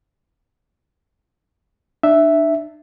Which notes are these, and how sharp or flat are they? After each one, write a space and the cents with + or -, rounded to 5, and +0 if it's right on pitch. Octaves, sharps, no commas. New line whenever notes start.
D4 +30 E5 +0